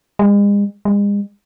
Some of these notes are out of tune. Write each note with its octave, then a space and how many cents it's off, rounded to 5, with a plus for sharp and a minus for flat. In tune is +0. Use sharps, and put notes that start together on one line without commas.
G#3 -40
G#3 -40